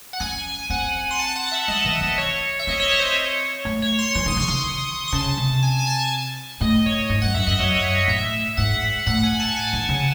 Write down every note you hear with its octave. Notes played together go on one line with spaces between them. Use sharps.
F#5
C#4 G#5
C4 F#5
C6
A5
F#5
E5
G#3 D#5
E3
C4
C#5
E5
C4 D#5
C#5
D#5
C5
C#5
A3
C#5
C6
E3 C6
D#3 D#6
C#3 C#6
D#3
C#6
C6
C#3 A5
C3
G#5
G#5
A5
A2 D#5
C#5
G#2
F#2 F#5
F#2 E5
F#2 D#5
F#2 C#5
C#5
C#5
A2 E5
G#2 F#5
A2 F#5
G#5
A5
G#5
D#3
C#3